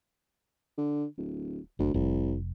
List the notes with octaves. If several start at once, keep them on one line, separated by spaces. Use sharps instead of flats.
D3
D1
F#1 D2
F1 C2